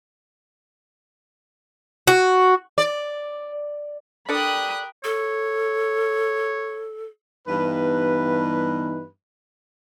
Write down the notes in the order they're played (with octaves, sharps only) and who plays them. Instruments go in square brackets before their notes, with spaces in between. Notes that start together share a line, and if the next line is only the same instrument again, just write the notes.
[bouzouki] F#4
[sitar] D5
[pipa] D4 A4 D5 [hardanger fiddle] G4 A#4 [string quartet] B5 D#6 F#6
[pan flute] A4 [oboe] C#5
[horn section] G2 B4 [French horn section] E3 B3 D#4